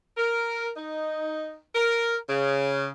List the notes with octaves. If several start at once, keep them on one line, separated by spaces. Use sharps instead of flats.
A#4
D#4
A#4
C#3